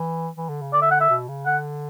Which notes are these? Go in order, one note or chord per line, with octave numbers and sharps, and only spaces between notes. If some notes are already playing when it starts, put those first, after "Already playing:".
Already playing: E3
E3
D3
C#3
D3 D5
E5
F#5
E5
B2
C#3
D3 F#5